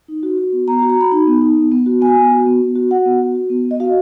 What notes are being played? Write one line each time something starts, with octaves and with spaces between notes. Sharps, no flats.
D#4
F#4
F#4
B3
B3 A#5
A#5
F#4
A#5
F#4 B5
D#4 B5
B3
D#4
B3
B3
F#4
B3 G#5
B3
F#4
B3
B3
F#4
F#4 F#5
B3
F#4
F#4
B3
B3
D#5
F#4 F5